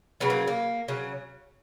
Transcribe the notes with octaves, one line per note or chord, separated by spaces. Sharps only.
C#3 F#3 B3
A#3
A#3
C#3 F#3